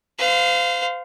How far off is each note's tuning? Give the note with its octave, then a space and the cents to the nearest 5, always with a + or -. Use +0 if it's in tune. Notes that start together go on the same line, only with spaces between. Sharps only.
C5 -35 F5 +0